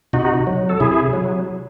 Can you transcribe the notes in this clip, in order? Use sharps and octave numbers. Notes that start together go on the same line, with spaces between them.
C3 D#4 F#4
F#3
A4
C3 E4 G#4
F#3